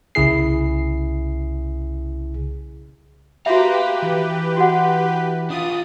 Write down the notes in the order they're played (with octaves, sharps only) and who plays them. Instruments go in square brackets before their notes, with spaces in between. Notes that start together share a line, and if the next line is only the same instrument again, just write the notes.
[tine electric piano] C2 C#3 E4 G#4 C7
[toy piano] F#4 E5 [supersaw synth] G4 B4 [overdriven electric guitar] F5 A#5
[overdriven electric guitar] E3
[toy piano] F#4 F#5
[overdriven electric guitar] D4 F4 [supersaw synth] D#6